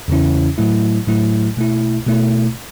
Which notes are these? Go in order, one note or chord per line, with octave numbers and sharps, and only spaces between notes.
E2 C#3 E3 C#4 E4
A2 F#3 A3 E4
A2 F#3 A3 E4
B2 A3 E4
B2 A3 E4